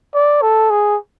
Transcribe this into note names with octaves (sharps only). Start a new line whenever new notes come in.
D5
A4
G#4